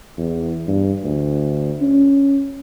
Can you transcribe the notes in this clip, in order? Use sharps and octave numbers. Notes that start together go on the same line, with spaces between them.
E2
G2
D2
C#4